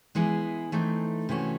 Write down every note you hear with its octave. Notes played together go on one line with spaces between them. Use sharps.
E3 G#3 B3 E4 G#4
E3 A3 C4 D#4
C3 E3 A3 C#4 F#4